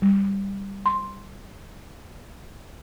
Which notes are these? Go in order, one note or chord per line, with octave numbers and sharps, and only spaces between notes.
G3
C6